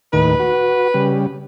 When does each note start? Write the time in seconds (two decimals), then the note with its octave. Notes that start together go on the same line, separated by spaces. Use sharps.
0.13 D#2 A2 D#3 B4
0.40 F#4
0.94 C#3 G3